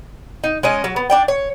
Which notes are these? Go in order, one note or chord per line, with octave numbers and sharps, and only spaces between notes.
D#4
G#3 C#4 D#5
F#3
B3
D4 D5 G5
C#5